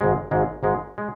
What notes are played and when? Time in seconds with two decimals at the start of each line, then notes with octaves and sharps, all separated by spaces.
0.01 G#1 G#2 G#3
0.31 G#1 G#2 G#3
0.63 G#1 G#2 G#3
0.98 G#3